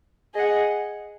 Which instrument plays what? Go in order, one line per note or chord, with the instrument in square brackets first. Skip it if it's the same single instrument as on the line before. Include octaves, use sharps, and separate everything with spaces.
[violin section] G#4 D#5 F#5